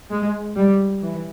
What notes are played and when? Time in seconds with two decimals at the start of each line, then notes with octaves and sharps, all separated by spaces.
0.11 G#3
0.56 G3
1.02 E3